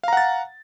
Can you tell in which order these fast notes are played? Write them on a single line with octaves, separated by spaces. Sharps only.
F5 A#5 F#5 A6